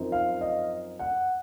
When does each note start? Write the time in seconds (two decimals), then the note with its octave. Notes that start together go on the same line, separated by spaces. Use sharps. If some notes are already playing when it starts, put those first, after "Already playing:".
Already playing: F#2 F3 C4 D#4
0.12 F5
0.41 D#5
0.99 F#5